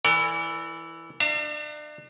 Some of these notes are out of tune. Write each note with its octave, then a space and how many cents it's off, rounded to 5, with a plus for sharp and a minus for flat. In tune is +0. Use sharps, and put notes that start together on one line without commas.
E3 +0 A#4 -40 D5 +0
D4 +35 E5 +45 A#5 -35